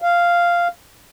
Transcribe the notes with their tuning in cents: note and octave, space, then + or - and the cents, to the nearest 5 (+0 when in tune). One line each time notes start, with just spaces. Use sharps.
F5 -5